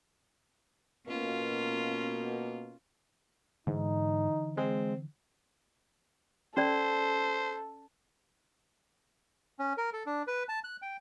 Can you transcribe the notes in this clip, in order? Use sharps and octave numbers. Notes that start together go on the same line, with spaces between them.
B2 A#3 C#4 F4
G#2 D3 E3 D#4
G#3 C4
C#4 A4 C5 D5
C#4
A#4
A4
D4
B4
A5
F#6
G5